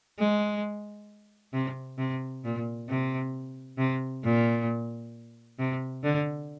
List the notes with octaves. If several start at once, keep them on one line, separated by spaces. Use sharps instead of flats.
G#3
C3
C3
A#2
C3
C3
A#2
C3
D3